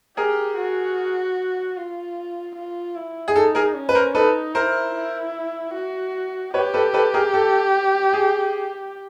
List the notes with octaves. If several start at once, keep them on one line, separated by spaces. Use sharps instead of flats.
G4 G#4 A#4
F#4
F4
F4
E4
G#4
D#4 A4
G#4 A#4
C#4
B4
A#4 C5
D#4 A4 B4
E4 A#4 C5
E4
F#4
G4 B4 C#5
A4 B4
A4 B4
G#4 A#4
A4
G#4